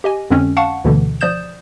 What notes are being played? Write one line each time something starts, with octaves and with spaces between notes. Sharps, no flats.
G4 D#5 G#5
F2 D3 G#3 C4 C#4
F5 F#5 A5 C#6
D2 B2 D3 E3
F3 D5 D#6 G6 E7